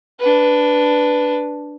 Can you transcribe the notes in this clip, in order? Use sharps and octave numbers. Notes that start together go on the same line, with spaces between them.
D4 B4